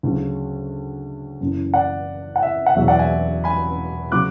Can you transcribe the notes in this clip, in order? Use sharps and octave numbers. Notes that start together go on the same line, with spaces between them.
D2 C#3 F#3
F#1 F#2 E3
D5 F#5
F#5
E5
F#5
E1 E2 B2 F#3 E5
D5 F#5
E5 G#5
G#5 B5
C#3 F#3 D6 F#6